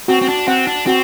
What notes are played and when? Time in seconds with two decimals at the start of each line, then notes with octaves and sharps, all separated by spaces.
0.08 C4 F#4
0.22 C4
0.28 D4
0.48 C4 F#5
0.67 D4
0.86 C4 F#4